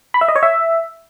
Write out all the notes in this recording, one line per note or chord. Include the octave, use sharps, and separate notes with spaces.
B5
E5
D#5
C#5
E5